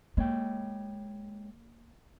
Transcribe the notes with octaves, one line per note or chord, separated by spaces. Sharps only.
G#3 A#3 C#5 G5